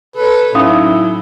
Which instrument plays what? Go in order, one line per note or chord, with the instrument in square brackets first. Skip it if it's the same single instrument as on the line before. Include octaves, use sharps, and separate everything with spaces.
[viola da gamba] A4 C#5 [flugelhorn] B4
[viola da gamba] A2 F#3 [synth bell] C#4 D#4 [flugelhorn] E4 [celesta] F5 D#6